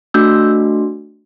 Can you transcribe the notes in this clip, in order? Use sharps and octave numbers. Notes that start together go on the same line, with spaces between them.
A3 D4 F#4 E6 G6